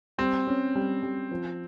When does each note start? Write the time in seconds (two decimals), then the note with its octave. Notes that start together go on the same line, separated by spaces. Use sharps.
0.18 G3 C4
0.47 C#4
0.75 G3
1.03 G3
1.31 F3